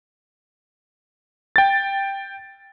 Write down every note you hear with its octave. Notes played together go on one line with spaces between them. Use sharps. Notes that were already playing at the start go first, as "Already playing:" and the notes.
G5 A6